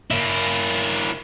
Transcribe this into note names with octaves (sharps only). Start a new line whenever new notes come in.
A#3 E4